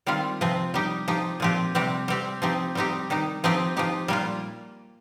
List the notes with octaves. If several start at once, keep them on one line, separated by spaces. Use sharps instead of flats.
D#3 G3 C4 F4
C3 F3 C4
G3 D#4 G4
F3 D#4 G4
A#2 F3 C4 G4
C3 G3 C4 G4
G3 C4 G4
F3 C4 D#4 G4
G3 C4 D#4 G4
D#3 G3 D#4
F3 C4 D#4 G4
F3 D#4 G4
A#2 G3 A#3 F4